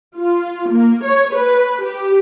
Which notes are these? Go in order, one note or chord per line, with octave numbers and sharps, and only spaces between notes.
F4
A#3
C#5
B4
G4